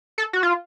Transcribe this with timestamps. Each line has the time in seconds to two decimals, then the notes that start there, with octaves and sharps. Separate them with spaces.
0.18 A4
0.33 F#4
0.43 F4